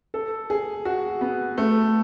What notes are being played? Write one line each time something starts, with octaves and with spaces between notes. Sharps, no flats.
A4
G#4
F#4
B3
A3